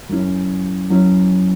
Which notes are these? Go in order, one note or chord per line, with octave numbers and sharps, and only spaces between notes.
F#2 F#3 C#4 E4
F#2 F#3 C#4 E4